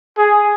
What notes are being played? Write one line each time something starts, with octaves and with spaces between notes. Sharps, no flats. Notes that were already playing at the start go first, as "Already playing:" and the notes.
G#4